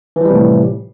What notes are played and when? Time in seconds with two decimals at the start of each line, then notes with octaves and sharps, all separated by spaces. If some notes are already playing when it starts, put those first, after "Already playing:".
0.16 E3
0.21 F3
0.25 G3
0.30 C3
0.35 A2